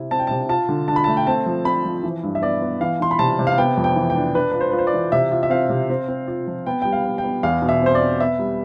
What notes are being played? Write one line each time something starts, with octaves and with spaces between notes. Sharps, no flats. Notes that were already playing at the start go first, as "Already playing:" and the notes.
Already playing: C3 E4
C4 A5
G5
C3 A5
F4 A5
D3
D4 A5
B5
A3 A5
G5
C4 A5
F3
C4 B5
F3
E3
G2
E5
B3 D5
B3
E3 F5
E3 C6
B5
C3 A5
C3
F5
B3 G5
F2
G5
E3
G5
D4
D4 B4
F4 B4
C5
F4 B4
C5
D5
E3
C3 E5
F4
E5
C4 F5
C3
C4
C4
F4
F3
B3 G5
G3 G5
F5
B3
G5
B3
E2 F5
B2
E5
C4 C5
D5
C4
B3 E5
G3